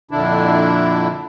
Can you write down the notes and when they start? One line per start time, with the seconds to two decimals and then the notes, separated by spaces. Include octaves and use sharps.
0.11 F2 A#2 D3 D4 E4